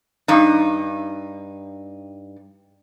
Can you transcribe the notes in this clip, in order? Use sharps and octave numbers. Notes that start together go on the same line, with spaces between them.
G2 D#4